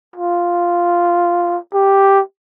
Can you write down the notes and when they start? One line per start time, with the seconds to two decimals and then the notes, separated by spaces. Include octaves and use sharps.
0.16 F4
1.74 G4